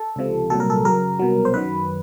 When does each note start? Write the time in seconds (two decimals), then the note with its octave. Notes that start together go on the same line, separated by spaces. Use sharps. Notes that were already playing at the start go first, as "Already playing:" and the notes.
Already playing: A4
0.16 C#2 C3 F3
0.50 C2 A#2 F#3 A4
0.60 A#4
0.70 A4
0.85 F#2 C#3 F#3 A#4
1.19 C2 B2 F#3
1.45 C5
1.54 F#2 D#3 F#3 B4